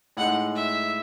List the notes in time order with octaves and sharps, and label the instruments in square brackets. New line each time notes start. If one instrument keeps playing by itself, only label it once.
[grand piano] A2 G#3 D#4 [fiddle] F#5
[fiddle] E5